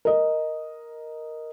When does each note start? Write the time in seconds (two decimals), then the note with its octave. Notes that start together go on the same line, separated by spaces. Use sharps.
0.05 A#4 D#5